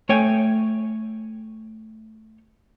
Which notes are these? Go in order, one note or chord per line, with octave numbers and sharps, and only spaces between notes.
A3 C#5 G5 G#5